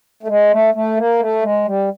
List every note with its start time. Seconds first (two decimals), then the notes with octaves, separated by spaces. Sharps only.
0.23 A3
0.28 G#3
0.51 A3
0.74 A3
0.97 A#3
1.20 A3
1.42 G#3
1.65 G3